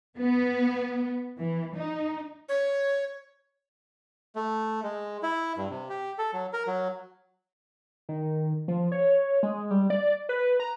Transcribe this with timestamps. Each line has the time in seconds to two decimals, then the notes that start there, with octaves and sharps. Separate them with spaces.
0.18 B3
1.39 E3
1.77 D#4
2.49 C#5
4.36 A3
4.83 G#3
5.23 E4
5.57 G2
5.70 C3
5.89 G4
6.18 A4
6.33 F#3
6.53 A#4
6.67 F#3
8.09 D#3
8.68 F3
8.92 C#5
9.43 G#3
9.71 G3
9.90 D5
10.29 B4
10.60 A#5